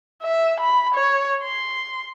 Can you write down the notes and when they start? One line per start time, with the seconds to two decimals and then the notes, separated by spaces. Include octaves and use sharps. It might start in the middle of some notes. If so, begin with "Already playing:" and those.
0.23 E5
0.60 B5
0.95 C#5
1.44 C6